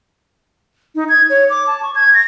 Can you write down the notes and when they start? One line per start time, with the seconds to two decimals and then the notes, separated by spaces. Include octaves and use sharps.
0.95 D#4
1.09 G#6
1.30 C#5
1.50 D6
1.67 A5
1.83 C#6
1.95 G#6
2.14 A#6